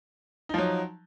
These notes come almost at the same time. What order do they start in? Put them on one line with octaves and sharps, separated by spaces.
D#4 F3 F#3